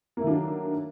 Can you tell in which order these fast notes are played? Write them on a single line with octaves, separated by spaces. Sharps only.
A#3 A3 D#3 D4 F#3